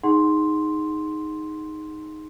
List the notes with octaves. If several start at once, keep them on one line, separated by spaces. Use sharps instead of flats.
D#4 G#4 F#5 C6